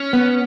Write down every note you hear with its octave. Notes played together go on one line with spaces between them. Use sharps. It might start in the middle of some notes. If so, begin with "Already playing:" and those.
Already playing: C#4
B3